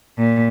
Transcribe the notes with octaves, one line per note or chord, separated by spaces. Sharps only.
A#2